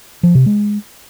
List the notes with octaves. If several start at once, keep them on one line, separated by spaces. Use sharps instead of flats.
F3
C3
G#3